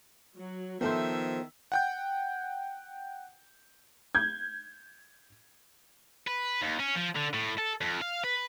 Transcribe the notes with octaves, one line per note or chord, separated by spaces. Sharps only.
F#3
D#3 F3 B3 A4 C5 E5
F#5 G5 G6
G6 G#6
B4
D#2
C#4
F3
D3
A2
A4
F2
F5
B4